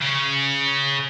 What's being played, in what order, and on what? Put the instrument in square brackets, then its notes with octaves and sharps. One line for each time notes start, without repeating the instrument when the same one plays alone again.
[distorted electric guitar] C#3 C#4